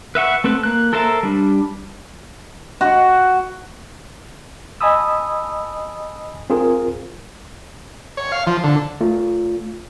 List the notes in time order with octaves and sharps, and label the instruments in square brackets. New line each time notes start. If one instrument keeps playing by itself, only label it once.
[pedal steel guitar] B4 E5 F#5 C#6
A3 C4 A4 B4
A#3 F#6
A4 A#4 C5 E5 A5
G3 D4
[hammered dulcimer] F#4
[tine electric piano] D#5 G#5 A5 B5 D#6 E6
C4 F4 G#4 A#4
[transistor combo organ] C#5
F5
F3
D3
[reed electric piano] A3 F4